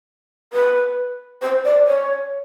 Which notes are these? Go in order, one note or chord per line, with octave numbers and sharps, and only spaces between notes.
B4
C5
D5
C#5